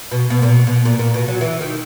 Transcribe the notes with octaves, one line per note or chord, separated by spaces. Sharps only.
B2
B2
A#2
B2
B2
A#2
A#2
B2
F#3
E3
D#3